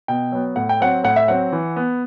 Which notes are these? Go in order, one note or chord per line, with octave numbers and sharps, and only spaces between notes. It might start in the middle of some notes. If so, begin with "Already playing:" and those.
B2 G5
F#3 B3
A2 F#5
G5
F#3 C4 F#5
A2 F#5
E5
F#3 C4 F#5
E3
B3